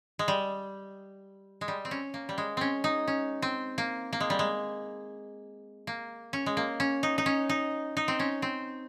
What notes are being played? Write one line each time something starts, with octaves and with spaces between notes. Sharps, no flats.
G#3
G3
G#3
G3
C4
C#4
A#3
G3
G#3
C4 C#4
D#4
C#4
C4
A#3
A#3
G#3
G3
G#3
A#3
C#4
G#3
A#3
C#4
D#4
D#4
C#4
D#4
D#4
C4
C#4
C4